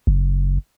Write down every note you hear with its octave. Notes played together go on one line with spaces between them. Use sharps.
F#1